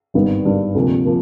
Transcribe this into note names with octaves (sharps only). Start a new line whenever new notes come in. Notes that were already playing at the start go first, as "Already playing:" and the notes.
G#1 G2 D#3 G3 B3
G#1 G2 D#3 G3 B3
D2 C3 F3 A#3
F3 A#3